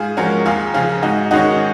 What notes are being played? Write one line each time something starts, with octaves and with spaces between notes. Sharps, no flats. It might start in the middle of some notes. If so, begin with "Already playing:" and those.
Already playing: G#2 F4 G#4
F3 G#3 C#4 F#4 A#4
D#2 F4 G#4
C#3 F3 F4 G#4
G#2 D#4 F#4
D#3 G#3 C#4 D#4 F#4